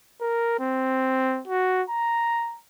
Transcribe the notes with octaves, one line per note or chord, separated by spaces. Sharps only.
A#4
C4
F#4
A#5